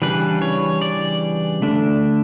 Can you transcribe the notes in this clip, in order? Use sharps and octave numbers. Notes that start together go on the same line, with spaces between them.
C#3 E3 G3 D4 B4
C#5
D5
D3 A3 D4